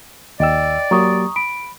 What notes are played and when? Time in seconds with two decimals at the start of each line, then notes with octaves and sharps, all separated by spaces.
0.40 D#2 D5 D#5 G5 E6
0.91 F#3 A#3 G4 A#5 C#6 D#6
1.36 B5 D7